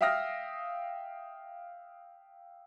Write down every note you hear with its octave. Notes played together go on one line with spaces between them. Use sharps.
E5 F5 G5 D#6 F6 A#6